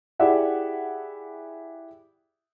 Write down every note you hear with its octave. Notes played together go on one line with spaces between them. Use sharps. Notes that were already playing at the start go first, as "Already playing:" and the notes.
E4 G4 G#4 D5 E5 F#5